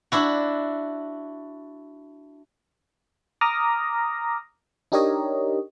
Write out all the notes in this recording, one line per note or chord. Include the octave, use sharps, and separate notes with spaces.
D4 E4 F#4
A#5 D6 D#6 F6 A#6
D4 D#4 G4 A#4 C#5 D#5